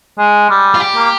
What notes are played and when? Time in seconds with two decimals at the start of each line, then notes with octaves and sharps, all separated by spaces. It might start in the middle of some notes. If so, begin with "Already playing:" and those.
0.19 G#3
0.50 G3
0.75 F4
0.80 G4
0.95 A#3